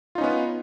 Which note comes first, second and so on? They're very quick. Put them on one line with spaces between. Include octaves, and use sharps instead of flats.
F4 D#4 C#4 B3